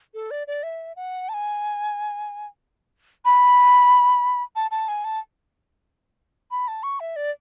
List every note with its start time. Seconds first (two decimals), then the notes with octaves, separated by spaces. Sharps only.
0.14 A4
0.31 D5
0.47 D5
0.63 E5
0.96 F#5
1.29 A5
1.34 G#5
3.25 B5
4.56 A5
4.71 A5
4.88 G#5
5.04 A5
6.51 B5
6.68 A5
6.83 C#6
7.00 E5
7.16 D5